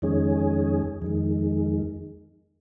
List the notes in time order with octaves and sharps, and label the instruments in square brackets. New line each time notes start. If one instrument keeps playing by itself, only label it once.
[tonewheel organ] F2 D#3 G#3 C#4 G#4
F2 D#3 G#3